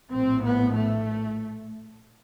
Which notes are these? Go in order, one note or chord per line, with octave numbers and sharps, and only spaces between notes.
A#1 A2 C4
B3
A3